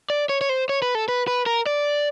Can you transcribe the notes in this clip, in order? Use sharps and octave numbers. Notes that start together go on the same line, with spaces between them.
D5
C#5
C#5
C5
C#5
B4
A4
B4
B4
A#4
D5